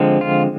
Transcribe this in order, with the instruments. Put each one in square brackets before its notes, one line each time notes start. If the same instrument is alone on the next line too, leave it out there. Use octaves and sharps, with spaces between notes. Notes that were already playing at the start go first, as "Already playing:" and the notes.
Already playing: [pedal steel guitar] D3 F3 G#3 C4
F4